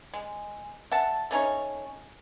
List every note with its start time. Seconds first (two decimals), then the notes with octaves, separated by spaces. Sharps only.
0.14 G#3
0.91 E5 F#5 A5
1.31 A3 C#4 D#4 C#5